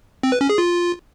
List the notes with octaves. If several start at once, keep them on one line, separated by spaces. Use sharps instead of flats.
C4
B4
C#4
G#4
F4